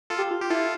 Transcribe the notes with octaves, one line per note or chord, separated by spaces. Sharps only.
F4 A4
G4
F4
G4
E4 F4 A4